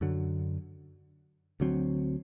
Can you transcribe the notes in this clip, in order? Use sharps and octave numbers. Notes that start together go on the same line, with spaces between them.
F#2 D3 F#3
D2 D3 F#3 C4